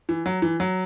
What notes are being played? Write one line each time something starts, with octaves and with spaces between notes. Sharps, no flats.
E3
F#3
E3
F#3